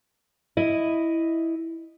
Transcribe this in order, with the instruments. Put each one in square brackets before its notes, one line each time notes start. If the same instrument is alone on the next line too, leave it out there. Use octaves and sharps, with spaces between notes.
[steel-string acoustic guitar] E4 D#5